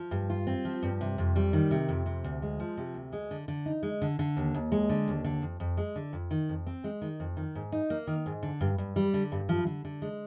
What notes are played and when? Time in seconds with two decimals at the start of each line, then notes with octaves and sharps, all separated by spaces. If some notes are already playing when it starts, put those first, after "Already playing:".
Already playing: F3
0.11 G2
0.30 F4
0.47 C4
0.65 F3
0.83 G2
1.01 C3
1.18 F2
1.36 G3
1.53 D#3
1.71 C3
1.89 F2
2.06 C3
2.24 D2
2.42 G#3
2.60 F3
2.77 C3
2.94 D2
3.12 G#3
3.31 D3
3.48 D3
3.66 D#4
3.83 G#3
4.02 D3
4.19 D3
4.37 D#2
4.54 D#2
4.72 G#3
4.89 D3
5.08 D#2
5.24 D3
5.42 F2
5.60 F2
5.77 G#3
5.96 D3
6.13 F2
6.31 D#3
6.49 F2
6.67 C4
6.84 G#3
7.02 D#3
7.20 F2
7.37 D#3
7.55 G#2
7.72 D#4
7.90 A#3
8.07 D#3
8.26 G#2
8.43 D3
8.61 G2
8.78 G2
8.96 G3
9.14 D3
9.32 G2
9.49 F3
9.66 D3
9.85 D3
10.02 G#3